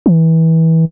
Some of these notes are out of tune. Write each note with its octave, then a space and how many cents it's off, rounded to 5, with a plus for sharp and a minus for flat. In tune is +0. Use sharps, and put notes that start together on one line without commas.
E3 -25